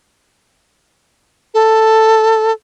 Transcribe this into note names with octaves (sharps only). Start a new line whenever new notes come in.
A4